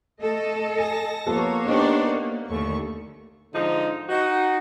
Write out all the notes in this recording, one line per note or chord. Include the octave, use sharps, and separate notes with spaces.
A3 A4 D#5
G#5 A5 A#6
F3 A#3 B3 A4 C#5
B3 D4 D#4 G4 C5 D5
A#3
D#2 D3 A3 C#6
G#2 D3 F3 D#4
D#4 F#4